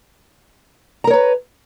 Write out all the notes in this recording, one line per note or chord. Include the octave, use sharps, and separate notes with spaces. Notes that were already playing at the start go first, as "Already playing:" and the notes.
A#4 B4 C#5 A#5